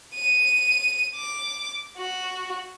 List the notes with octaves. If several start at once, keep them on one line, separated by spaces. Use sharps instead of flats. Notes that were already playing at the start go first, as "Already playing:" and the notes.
D#7
D6
F#4